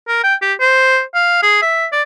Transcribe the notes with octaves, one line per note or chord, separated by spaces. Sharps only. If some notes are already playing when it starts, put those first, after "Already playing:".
A#4
G5
G4
C5
F5
G#4
E5
D5